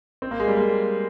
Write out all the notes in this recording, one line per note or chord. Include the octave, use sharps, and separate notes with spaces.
C4
A#3
G#3
G3
A#3